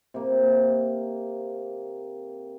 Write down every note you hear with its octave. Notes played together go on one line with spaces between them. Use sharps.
C3 A#3